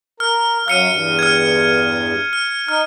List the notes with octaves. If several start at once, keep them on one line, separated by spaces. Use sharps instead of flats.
A#4 F6
F#2 F#3 F5 F6 C#7 D#7
E2 G2
F6 G#6
F6
D#4 F6